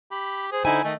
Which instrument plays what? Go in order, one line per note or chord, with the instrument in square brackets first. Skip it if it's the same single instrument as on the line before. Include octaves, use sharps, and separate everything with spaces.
[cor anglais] G4 [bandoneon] B5
[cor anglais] G#4 [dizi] C5
[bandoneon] D3 D#4 [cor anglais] E4 [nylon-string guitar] G#5
[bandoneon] D#3 [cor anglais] A3 [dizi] D#5